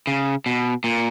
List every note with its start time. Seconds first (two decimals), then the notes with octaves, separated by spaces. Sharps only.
0.07 C#3
0.46 B2
0.84 A#2